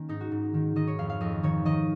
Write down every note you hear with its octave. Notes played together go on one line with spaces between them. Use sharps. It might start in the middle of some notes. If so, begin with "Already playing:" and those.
Already playing: D#3 A#3 C#4
G#2 D#4
F#4
G#2
D#3
D#3 D#5
C#5
F2 F5
F5
F2 D#5
D#3 C#5
D#3 D#5